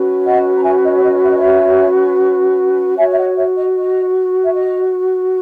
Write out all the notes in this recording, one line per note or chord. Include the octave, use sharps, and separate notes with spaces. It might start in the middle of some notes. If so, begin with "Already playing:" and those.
Already playing: C#4 F#4 B4
D#5 F#5
A#5
E5 G#5
D#5
C#5
D#5
E5
D#5
C#5 E5
F#4 C#5 E5 G#5
E5
D#5 F#5
C#5 E5
D#5
D#5
E5
D#5